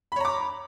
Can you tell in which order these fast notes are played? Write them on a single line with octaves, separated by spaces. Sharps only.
B5 C#5 A#5 D6